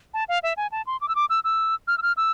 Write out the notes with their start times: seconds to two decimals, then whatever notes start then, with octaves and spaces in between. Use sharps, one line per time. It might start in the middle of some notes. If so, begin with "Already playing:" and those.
0.14 A5
0.29 F5
0.43 E5
0.57 G#5
0.72 A5
0.87 C6
1.01 D6
1.08 E6
1.15 D6
1.30 E6
1.44 E6
1.88 F6
1.98 E6
2.02 F6
2.17 E6